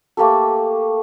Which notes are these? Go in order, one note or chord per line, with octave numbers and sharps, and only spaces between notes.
A3 A#3 G4 A4